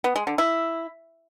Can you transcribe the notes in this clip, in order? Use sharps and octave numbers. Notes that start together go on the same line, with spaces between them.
B3
G#3
D3
E4